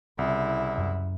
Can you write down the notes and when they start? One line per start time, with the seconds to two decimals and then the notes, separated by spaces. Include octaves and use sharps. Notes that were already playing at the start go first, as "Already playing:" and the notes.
0.19 C2 C#3 E4
0.78 F#2